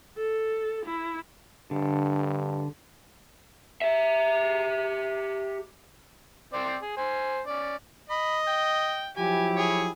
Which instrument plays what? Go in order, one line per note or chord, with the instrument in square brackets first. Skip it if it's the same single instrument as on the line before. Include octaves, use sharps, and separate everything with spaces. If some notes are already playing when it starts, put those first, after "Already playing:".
[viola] A4
E4
[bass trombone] G2 [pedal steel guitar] D3
[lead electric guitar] G4 E5
[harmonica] C4 C5 D5
G#4
C5 G#5
C#4 D5
[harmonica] D#5 [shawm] B5
[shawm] G5
[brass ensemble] F3 F#3 E4 [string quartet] G4 [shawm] G#5
[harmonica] G#4 [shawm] C#5